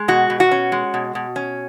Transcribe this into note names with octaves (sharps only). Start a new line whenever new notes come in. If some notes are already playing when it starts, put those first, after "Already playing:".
Already playing: G#3
B2 F#4
B2
F#4
C#4
G#3
B2
B2
C#4